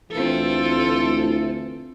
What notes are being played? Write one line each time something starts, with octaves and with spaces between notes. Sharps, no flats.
D2 E3 C4 F4 A4